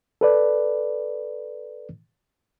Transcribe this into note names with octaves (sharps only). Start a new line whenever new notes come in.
A4 B4 D5